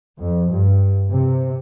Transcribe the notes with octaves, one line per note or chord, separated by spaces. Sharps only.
F2
G2
C3